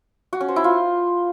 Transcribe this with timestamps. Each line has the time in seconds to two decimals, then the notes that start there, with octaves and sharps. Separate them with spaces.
0.33 F#4
0.41 C#4
0.48 C5
0.56 E4
0.64 F4